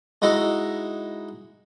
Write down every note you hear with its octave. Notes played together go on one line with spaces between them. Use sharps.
G#3 D#4 E4 F#4